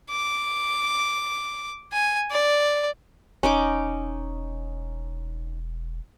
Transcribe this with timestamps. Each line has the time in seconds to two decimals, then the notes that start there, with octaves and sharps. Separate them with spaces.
0.10 D6
1.92 G#5
2.31 D5
3.43 E1 C#4 D#4 D6